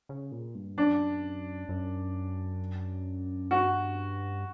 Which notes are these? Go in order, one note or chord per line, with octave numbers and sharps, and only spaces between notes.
C#3
A#2
G2
F#2 D4
F#2
G2 F#4